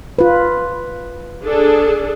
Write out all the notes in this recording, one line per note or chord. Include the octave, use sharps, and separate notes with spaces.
F4 B4
D4 G#4 A4